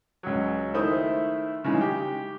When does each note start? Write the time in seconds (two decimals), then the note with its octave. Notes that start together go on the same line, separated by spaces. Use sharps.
0.23 C#2 F#3
0.74 D#3 A3 E4 C5 E5 D#6
1.64 C#3 E3 G#3 D#4
1.81 G4